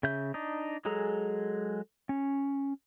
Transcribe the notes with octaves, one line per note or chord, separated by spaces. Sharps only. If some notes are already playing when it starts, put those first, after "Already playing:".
C#3 E5 G6
D4 D#4
F#3 G#3 G#4 A4 A#5
C#4